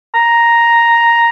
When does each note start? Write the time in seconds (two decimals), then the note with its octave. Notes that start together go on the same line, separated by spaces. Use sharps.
0.15 A#5